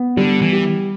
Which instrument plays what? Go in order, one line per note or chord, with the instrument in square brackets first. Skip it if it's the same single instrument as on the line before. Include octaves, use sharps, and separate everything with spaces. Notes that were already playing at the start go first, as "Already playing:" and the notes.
Already playing: [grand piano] B3 B4
[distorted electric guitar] D3 [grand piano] G3
[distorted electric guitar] E3
[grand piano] G4